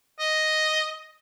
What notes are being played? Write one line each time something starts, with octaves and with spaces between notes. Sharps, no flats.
D#5